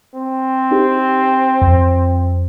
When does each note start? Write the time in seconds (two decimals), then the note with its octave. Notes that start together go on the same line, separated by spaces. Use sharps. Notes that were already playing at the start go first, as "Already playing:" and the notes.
0.14 C4
0.71 D#4 G4
1.61 F2